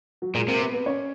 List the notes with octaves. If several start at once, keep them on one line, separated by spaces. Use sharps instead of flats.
F#3 F#4
A#2 G#3 G#4
C3 A#3 A#4
B3 B4
B3 B4
C#4 C#5